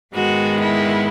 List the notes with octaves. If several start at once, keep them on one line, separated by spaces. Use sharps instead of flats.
G#2 D#3 G#3 B3 F#4
E4